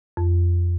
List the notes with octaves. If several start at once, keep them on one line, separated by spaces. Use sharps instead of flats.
F2